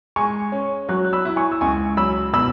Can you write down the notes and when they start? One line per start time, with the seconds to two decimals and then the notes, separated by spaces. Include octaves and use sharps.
0.16 G#3 G#5 C#6
0.52 C#4
0.89 F#3 C#6 F#6
1.05 F#6
1.13 B5 E6
1.25 E4
1.36 G#5 C#6
1.52 E6
1.61 C#2 G#5 C#6
1.97 F#3 B5 E6
2.34 B2 B5 E6